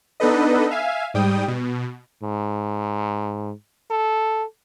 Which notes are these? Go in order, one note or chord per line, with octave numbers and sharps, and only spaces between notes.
B3 D4 D#4 A4 B4 D#5
E5 F5 G#5
G#2 G3 G5 D#6
B2
G#2
A4